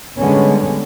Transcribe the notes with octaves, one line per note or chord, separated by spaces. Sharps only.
D3 G3 G#3 B3 C#4